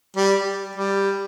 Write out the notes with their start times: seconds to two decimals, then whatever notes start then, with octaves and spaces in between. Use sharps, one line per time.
0.16 G3
0.75 G3